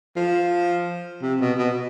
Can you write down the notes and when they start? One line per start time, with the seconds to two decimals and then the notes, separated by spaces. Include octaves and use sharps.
0.16 F3
1.22 C3
1.41 B2
1.58 B2